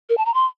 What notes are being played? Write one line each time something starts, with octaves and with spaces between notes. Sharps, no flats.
A#4
A5
A#5
C6